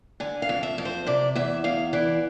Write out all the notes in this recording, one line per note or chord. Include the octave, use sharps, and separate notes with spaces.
D3 G#5
F5
F2
E5
F2
C5
C3 D5
E2 E5
E2 F5
E3 D5